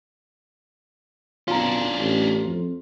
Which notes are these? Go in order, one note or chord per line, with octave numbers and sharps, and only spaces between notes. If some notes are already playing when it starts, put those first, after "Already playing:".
B1 C#4 D4 F4 A#5
A1
F2